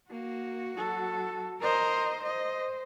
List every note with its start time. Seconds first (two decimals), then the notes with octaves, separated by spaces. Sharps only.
0.10 A#3 F#4
0.77 F#3 A4
1.62 A#4 C5 D#5
2.23 C5 D#5